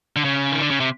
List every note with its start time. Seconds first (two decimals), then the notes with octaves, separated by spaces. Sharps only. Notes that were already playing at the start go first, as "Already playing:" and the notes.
0.16 D3
0.24 C#3
0.52 D#3
0.61 D3
0.70 C#3
0.80 C3